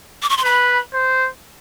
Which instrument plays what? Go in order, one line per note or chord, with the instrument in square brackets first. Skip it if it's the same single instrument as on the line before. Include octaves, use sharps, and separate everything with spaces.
[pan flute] D6
C#6
C6
[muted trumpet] B4 [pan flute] B5
[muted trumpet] C5